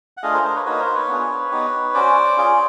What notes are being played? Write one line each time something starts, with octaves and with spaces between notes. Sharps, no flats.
F#5
A3 D4 F4 G#4 D#5 F5
A#4 C5
A#4 C5
B4 C#5
A#3 D#4 F#4 B4 C#5
A#4 C5
B4 C#5
B3 D4 F4 G#4
B3 D#4 G4
C#4 F#4 C5 D5
C#4 F4 G#4